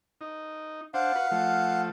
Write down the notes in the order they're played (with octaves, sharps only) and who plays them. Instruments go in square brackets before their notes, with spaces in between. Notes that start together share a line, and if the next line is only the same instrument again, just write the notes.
[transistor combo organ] D#4
[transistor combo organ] D4 C5 [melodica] F5 F#5
[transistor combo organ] F#4 B4
F3 A3